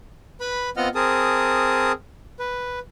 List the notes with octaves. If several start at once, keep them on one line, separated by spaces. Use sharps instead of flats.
B4 B5
B3 C4 F4 D#5 F#5 F6
C4 G#4 A#4 A5 D#6
B4